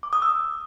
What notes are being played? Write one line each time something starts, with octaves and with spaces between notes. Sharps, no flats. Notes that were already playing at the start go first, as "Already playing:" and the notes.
D6
D#6
E6